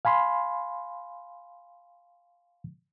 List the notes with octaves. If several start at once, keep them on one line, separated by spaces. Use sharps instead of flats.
F5 G#5 B5 C6